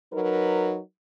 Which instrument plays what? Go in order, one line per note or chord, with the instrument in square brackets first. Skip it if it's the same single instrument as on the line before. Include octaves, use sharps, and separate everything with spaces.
[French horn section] F#3 D#4 A#4 B4